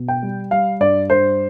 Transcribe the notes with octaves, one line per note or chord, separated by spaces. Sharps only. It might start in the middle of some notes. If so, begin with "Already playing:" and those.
Already playing: B2
G5
G3
G3 F5
G2 D5
G2 C5